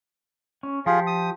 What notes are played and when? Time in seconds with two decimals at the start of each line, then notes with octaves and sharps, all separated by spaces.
0.63 C#4
0.86 F3 F4 G4 G#4
1.07 D#6